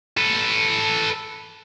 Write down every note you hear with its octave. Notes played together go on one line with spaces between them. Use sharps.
A4 B4